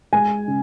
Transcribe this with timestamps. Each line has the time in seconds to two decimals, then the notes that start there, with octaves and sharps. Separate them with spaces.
0.13 G#3 G#5
0.48 C#3